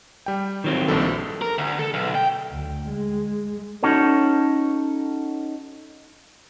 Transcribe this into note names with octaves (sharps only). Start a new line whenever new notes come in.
G3 G5
D#3 F#3 C4
A#1 G2 A4
A#4
D2
A4
B1
G5
D2
G#3
C#4 D#4 F#4 A4 C#5